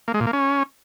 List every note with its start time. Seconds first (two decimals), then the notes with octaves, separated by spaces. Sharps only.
0.08 A#3
0.14 G#3
0.21 A#2
0.27 A#3
0.33 C#4